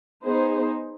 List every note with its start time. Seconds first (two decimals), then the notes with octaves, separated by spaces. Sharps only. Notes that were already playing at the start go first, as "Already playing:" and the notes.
0.24 B3 D#4 G#4 C5